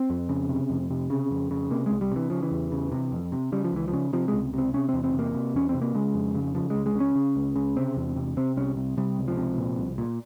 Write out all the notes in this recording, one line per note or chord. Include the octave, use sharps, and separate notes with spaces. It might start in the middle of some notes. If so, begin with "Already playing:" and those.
Already playing: C4
F2
C#3
C3
F2
C3
C#3
F2
C#3
C3 A#3
C2 G#3
G3
C3 E3
C#3 F3
E3
E2
C#3
C3
F2
C3
C#3 G3
F3
C#2 E3
F3
C#3
C3 F3
C#2 G#3
C3 C4
C3 C#4
E2 C4
C4
C3
A#3
C3
E2 C#4
C4
C3
A#3
C#3 G#3
F2
C#3
C#3 F3
C#2 G#3
G#3
C#3 C#4
C#3
C#2
C#3
C3 C4
E2
C3
C3 C4
C2 C#4
C3
C3 G3
C#2
F3
C3
A#2
C2
A#2